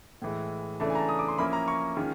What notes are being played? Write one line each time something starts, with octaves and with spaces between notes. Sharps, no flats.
A2 E3 G#3
C#3 E3 A3 D4 A5
G#5
A#5
A5
D#6
D6
C6
F3 A#3 C#4 E4 B5
A#5
C#6
D#3 G#3 C#4 F4